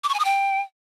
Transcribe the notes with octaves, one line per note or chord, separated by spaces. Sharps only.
D6
C#6
G#5
D#6
G5